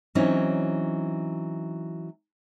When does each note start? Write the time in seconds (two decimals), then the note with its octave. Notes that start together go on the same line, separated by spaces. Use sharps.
0.15 E3 F#3 C4 C#4 D#4